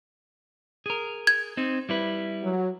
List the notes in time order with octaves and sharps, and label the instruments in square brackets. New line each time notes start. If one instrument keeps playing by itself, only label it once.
[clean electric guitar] G#4 A#4
[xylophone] G#6
[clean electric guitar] C4 D#4
G3 E4 B4
[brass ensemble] F#3